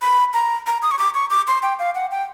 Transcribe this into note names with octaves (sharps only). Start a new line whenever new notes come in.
B5
A#5
A#5
D#6
C#6
D6
C#6
D6
C6
G5
F5
F#5
G5